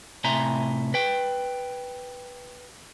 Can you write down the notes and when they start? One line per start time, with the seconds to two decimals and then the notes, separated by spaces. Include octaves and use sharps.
0.24 A2 C3 E5 G#5 A#5 C6
0.94 B4 G5